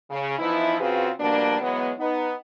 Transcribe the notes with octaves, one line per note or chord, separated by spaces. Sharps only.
C#3
E3 F3 B3 D#4 E4
C#3 C4 F4 F#4 G#4 B4
B2 F3 G3 A#3 D4
E3 F#3 G#3 B3
B3 D#4